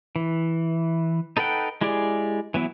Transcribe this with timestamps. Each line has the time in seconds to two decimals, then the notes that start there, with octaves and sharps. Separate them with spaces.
0.16 E3
1.37 D#4 A4 B4 F#5 G5
1.81 G#3 E4 G4 G#4 D5
2.54 E3 F#3 B3 E4